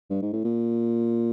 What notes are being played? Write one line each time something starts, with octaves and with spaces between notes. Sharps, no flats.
G2
G#2
A2
A#2